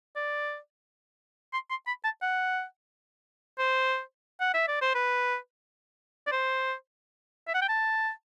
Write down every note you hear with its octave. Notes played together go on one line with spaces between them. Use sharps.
D5
C6
C6
B5
A5
F#5
C5
F#5
E5
D5
C5
B4
D5
C5
E5
F#5
G5
A5